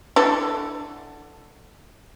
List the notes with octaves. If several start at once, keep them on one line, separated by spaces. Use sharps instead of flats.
D3 E3 A4